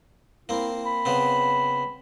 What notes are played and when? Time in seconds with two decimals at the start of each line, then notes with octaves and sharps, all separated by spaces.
0.49 A#3 C4 E4
0.86 B5
1.05 C#3 B3 C4